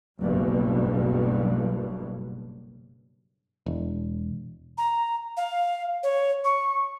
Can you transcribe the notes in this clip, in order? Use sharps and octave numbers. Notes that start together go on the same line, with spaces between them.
F#1 B1 G2 B2
E1
A#5
F5
C#5
C#6